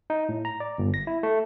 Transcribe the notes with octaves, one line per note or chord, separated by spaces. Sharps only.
D#4
A2
A#5
D5
G1
A#6
E4
A3